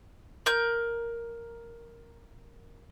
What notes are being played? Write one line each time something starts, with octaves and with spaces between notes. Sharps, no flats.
A#4 G6